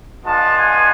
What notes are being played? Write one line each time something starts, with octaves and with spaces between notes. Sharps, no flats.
G#3 B3 D4 F4 A5
G#5